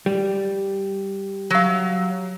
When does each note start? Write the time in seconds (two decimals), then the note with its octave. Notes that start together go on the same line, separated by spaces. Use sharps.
0.06 G3
1.50 F#3 F5